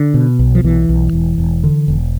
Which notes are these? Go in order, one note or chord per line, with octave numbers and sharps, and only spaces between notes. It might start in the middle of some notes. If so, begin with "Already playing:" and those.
Already playing: D3
B2
B1
F3
B1 E3
B1
E1
E1
D3
E1